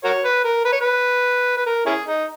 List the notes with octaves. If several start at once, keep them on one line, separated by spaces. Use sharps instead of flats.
F#4 A#4 C#5
B4
A#4
B4
C#5
B4
B4
A#4
C#4 E4 G#4
D#4